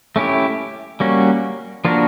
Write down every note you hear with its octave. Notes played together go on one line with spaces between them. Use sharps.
A3 C#4 E4 G4
G3 A#3 C#4 F#4
F3 A#3 D4 F#4 A#4